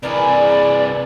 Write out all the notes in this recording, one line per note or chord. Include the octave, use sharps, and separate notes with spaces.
C3 E3 G#4 A#4 B4 D5